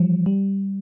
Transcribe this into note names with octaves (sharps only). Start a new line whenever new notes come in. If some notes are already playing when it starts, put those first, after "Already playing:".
Already playing: E3 F3 G3
G3